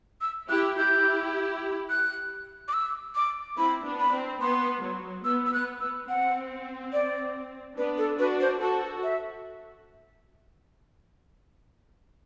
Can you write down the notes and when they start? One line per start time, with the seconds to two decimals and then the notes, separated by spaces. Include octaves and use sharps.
0.21 E6
0.49 E4 G4 F#6
0.78 E4 G4 G6
1.90 F#6
2.68 D6
2.73 E6
3.16 D6
3.58 C4 E4 B5
3.85 B3 D4
4.00 B5
4.13 C4
4.41 B3 C6
4.83 F#3
5.25 B3 E6
5.46 E6
5.53 B3 F#6
5.81 B3 E6
6.09 C4 F#5
6.93 D5
7.77 B3 D4 B4
7.98 A4
8.19 D4 F#4 B4
8.41 C5
8.61 F#4 A4 A5
9.03 E5